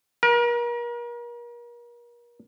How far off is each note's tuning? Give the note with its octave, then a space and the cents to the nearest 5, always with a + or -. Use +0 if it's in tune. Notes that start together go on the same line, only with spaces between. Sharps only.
A#4 +40